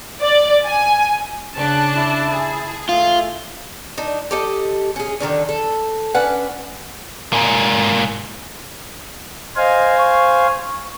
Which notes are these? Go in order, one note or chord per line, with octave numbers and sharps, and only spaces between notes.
D5
G#5
C#3 D4 A5 F#6
E4
G#4
A3 F4
D4 D#4
G4 A4 D#5
C#4 G#4
D3 D#3 F#3 D4
A4
C#4 D4 B4 F#5
G#2 A#3
C5 D#5 F5 G#5
C#6